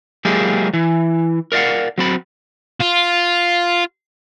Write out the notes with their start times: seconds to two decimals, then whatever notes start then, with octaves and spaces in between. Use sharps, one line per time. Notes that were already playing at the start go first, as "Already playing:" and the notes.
0.25 F#3 G#3 A#3 E4 G4 G#4
0.74 E3
1.52 A#4 D5 D#5 F5 F#5
1.98 F#3 C4 B5
2.81 F4